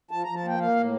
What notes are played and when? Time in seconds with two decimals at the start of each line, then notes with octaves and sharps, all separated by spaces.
0.11 F3 A5
0.24 F3 A#5
0.35 A5
0.44 A#3 G5
0.60 A#3 F5
0.76 A2